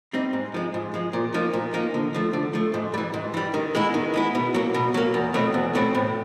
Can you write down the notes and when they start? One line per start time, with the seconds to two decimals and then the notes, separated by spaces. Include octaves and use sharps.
0.13 G3 C4 D#4
0.33 G#2
0.54 F3 G#3
0.74 G#2
0.94 F3 G#3
1.13 A#2
1.34 F3 A#3 D#4
1.53 A#2
1.73 F3 A#3 D#4
1.94 D3
2.15 F3 A3
2.33 D3
2.54 F3 A3
2.74 G#2
2.94 G3
2.98 E3
3.14 G#2
3.34 E3 G3
3.54 D#3
3.75 G#3 B3 E4
3.94 D#3
4.14 G#3 B3 E4
4.35 B2
4.54 F#3 A#3
4.74 B2
4.94 F#3 A#3
5.14 E2
5.34 B2 F#3 A3 C4
5.54 E2
5.75 B2 F#3 A3 C4
5.95 A2